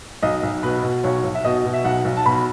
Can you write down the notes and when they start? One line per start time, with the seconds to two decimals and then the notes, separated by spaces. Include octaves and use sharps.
0.22 B1 D#5
0.43 B1
0.63 B2 B4
0.83 B2
1.04 B1 C#5
1.24 B1
1.35 E5
1.44 B2 D#5
1.65 B2
1.74 E5
1.85 B1 F#5
2.05 B1
2.17 A5
2.25 B2 B5